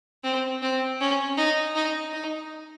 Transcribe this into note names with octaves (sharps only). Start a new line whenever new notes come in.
C4
C4
C#4
D#4
D#4
D#4